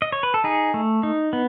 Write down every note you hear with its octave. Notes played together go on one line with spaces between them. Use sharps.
D#5
C#5
B4
A4
D#4 G#4
A3
D#4
B3